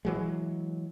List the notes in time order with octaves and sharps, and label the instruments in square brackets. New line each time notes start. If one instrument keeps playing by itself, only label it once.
[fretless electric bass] E3 F#3 G#3